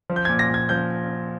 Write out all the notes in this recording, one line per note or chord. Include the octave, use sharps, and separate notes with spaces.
F3
G6
A#2 G#6
A#6
A#2 G#6
F3 G6